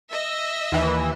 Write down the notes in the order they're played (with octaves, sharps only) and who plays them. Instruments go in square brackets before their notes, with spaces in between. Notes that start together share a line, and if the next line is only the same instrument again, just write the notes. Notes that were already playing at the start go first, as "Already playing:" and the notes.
[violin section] D#5 E5 E6
[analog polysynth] D#2 E3